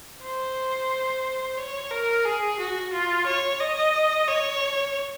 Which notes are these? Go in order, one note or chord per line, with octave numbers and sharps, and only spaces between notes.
C5
C#5
A#4
G#4
F#4
F4
C#5
D#5
C#5